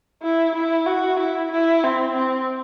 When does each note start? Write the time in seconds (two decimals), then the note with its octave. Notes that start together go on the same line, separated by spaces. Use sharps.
0.23 E4
0.55 E4
0.87 F#4
1.19 E4
1.52 E4
1.84 C4
2.16 C4